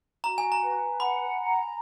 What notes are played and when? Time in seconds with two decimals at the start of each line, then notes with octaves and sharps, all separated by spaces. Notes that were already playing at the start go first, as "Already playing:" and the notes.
0.24 F#4 A#5
0.38 G#5
0.52 A#5
0.61 B4
0.99 F#5 B5
1.38 A#5